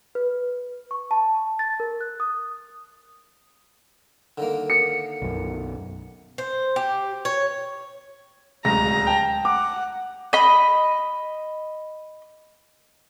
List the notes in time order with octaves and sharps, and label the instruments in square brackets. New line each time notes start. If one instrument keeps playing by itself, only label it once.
[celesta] B4
C#6
A5
A6
A#4
F#6
D#6
[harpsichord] D3 D#3 A#3
[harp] C#7
[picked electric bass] B1 F#2
[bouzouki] C5
G4
C#5
[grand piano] D1 C#2 A#6 [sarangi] A#5
[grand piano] G5 A5
[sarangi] F#5 [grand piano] D6
[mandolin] D#5 B5